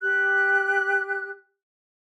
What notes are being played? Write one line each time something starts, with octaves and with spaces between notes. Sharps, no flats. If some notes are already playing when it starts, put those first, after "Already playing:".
G4 F#6